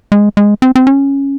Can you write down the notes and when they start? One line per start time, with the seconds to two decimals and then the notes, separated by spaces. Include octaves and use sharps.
0.12 G#3
0.37 G#3
0.62 C4
0.76 C4
0.87 C#4